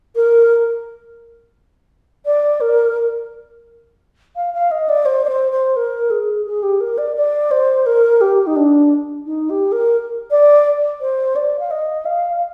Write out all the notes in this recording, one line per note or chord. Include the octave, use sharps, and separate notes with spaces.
A#4
D5
A#4
F5
F5
D#5
D5
C5
D5
C5
C5
A#4
G#4
G#4
G4
A#4
D5
D5
C5
A#4
G4
D#4
D4
D#4
G4
A#4
D5
C5
D5
F5
D#5
F5